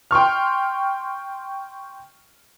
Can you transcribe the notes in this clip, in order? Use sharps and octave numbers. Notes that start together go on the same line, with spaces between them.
G5 C6 C#6 F6